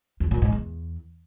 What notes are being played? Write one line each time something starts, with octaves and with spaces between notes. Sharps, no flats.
E2
A#2
G#2
E2